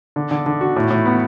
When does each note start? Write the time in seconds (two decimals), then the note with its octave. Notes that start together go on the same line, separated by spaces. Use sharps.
0.16 D3
0.31 D3
0.46 D3
0.61 F#4
0.76 A2
0.90 A2
1.06 B3